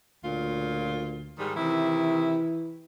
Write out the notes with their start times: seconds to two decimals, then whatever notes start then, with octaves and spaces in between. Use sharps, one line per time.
0.24 D2 A#2 C#3 F4
1.38 G#2 D#3 G3
1.57 C3 D#3 E3 E4